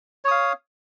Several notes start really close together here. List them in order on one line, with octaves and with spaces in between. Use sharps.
C#5 D#6 F5